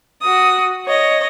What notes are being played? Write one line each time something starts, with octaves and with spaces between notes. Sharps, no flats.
F#4 D#6
C#5 D#5